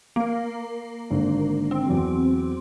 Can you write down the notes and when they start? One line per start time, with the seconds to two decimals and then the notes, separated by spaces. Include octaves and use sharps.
0.16 A#3 A#4
1.10 G#1 D3
1.71 C4
1.86 E2 F#3